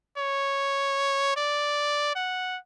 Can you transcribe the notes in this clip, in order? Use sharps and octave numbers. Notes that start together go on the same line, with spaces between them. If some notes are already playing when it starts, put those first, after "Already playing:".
C#5
D5
F#5